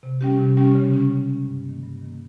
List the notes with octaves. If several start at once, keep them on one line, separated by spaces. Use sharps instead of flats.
C3
G3 C#4 G4
C3
G3 C#4 G4
C#3
G#3 C#4
C#3
G#3 C#4
G2
D#3 A#3
G2
D#3 A#3